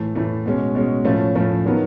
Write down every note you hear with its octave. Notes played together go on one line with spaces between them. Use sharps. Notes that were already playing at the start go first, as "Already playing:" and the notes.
Already playing: A2 E3 A3
A2 E3 A3
B2 G#3 C#4
B2 G#3 C#4
A2 F3 A3 C#4
A2 F3 A3 C#4
D#3 F#3 B3